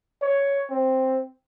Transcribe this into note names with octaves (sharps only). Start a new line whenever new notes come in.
C#5
C4